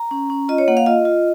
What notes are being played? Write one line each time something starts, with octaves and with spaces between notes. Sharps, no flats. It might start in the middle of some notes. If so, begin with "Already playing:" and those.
Already playing: A#5
C#4
C#4
F4 D#5
C#5
A#3 F#5
F5
F4 D#5
F4